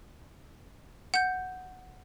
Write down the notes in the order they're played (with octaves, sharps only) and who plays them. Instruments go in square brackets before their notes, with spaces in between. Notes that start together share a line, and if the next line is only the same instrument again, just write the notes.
[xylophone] F#5 G6